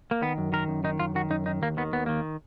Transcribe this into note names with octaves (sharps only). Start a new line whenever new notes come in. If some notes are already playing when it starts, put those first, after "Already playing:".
A#3
D#3 B3
F#2
D#3 A#4
F#2
D#3 D#4
F#2 F4
D#3 F#4
F#2 D#4
D#3 D#4
D#2 A#3
D#3 B3
D#2 B3
D#3 A#3